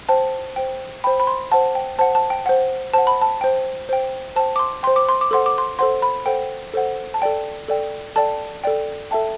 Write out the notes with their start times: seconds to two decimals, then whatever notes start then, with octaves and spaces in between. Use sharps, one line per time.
0.09 C5 G5 A5
0.56 C5 G5
1.04 C5 G5 B5
1.20 B5
1.27 C6
1.52 C5 F#5 A5
1.75 G5
1.99 C5 F#5 A5
2.15 A5
2.30 G5
2.46 C5 F#5
2.93 C5 F#5 A5
3.07 B5
3.22 A5
3.41 C5 G5
3.89 C5 G5
4.36 C5 G5 A5
4.56 D6
4.59 C6
4.83 C5 G5 C6
4.96 D6
5.09 C6
5.21 D6
5.31 A4 C5 F#5 C6
5.46 D6
5.58 C6
5.79 A4 C5 F#5 C6
6.02 B5
6.26 A4 C5 F#5 G5
6.74 A4 C5 F#5
7.14 A5
7.22 A4 D5 G5
7.68 A4 D5 G5
8.16 A4 D5 G5 A5
8.64 A4 D5 G5
9.11 A4 E5 G5 A5